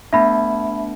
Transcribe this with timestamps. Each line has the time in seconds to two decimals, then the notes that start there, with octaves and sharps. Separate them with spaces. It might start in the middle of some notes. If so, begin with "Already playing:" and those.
0.13 A3 B3 D4 E5 B5